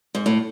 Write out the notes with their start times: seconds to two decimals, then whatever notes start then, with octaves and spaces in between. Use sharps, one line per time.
0.15 G#2
0.26 A2